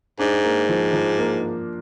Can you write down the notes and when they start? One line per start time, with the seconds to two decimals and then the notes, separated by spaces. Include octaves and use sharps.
0.19 G#2 D4
0.44 A#3
0.69 F3
0.93 F3
1.18 A#3